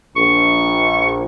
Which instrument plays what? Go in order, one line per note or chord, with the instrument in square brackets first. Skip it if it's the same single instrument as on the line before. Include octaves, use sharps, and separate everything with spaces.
[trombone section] A#1 [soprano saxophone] C#6